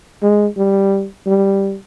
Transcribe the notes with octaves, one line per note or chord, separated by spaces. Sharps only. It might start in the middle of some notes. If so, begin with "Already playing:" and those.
G#3
G3
G3